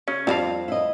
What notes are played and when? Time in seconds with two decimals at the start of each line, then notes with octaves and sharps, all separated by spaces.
0.08 C#3 C#4
0.27 F2 G3 C4 D4 F4 F5
0.68 E4 D#5